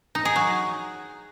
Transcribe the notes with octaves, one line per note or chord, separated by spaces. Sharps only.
D#4
G#4
F#3